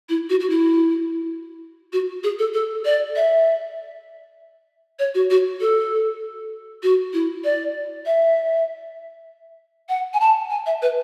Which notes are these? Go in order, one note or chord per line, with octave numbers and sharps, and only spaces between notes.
E4
F#4
F#4
E4
F#4
G#4
A4
A4
D5
E5
C#5
F#4
F#4
A4
F#4
E4
D5
E5
F#5
G#5
A5
G#5
E5
B4